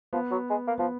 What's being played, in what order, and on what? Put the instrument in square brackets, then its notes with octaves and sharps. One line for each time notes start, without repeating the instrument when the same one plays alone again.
[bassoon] F3 [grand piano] B3
[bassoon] F#3
G#3
A#3
[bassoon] F3 [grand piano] B3